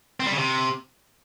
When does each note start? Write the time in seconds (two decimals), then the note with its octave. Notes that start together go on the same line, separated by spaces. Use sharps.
0.20 C4
0.26 G3
0.32 C#3
0.38 C3